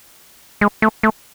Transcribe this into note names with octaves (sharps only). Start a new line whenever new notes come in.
G#3
A3
A3